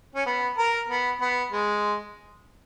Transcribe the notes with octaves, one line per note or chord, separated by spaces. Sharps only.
C#4
B3
A#4
B3
B3
G#3